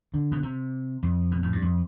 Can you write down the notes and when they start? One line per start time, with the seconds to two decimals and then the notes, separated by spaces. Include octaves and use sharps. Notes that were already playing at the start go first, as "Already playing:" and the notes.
0.14 D3
0.32 B2
0.43 C3
1.03 F2
1.31 B2
1.42 A2
1.53 G2
1.62 F2